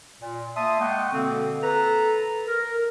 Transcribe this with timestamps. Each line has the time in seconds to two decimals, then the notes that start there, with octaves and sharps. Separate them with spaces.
0.21 A#2
0.56 A#3 E5 A5 C6 D#6
0.80 G#3 A#3 F#5 G5 C#6 D#6
1.12 B2 D3 A#3 C4
1.63 A4 B4 A#5
2.48 A#4